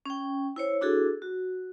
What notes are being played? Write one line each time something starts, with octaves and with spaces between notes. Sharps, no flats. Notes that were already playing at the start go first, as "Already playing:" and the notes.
C#4 G5
E4 C5 C#5
D4 E4 F#4 G#4 A4
F#4